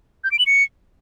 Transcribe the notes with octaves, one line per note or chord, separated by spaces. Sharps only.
G6
D7
F#7
C#7